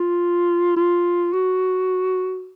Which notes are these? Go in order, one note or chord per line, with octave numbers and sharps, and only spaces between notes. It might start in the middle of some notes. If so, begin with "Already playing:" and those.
Already playing: F4
F4
F#4